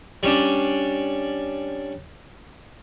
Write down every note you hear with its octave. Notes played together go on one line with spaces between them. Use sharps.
G3 C#4 D4